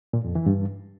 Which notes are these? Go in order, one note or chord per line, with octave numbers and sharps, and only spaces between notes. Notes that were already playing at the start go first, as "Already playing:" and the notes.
A#2
F2
E3
G2